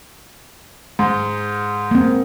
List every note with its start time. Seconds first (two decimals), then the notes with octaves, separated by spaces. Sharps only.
0.99 G#2 G#3
1.91 A#3 C4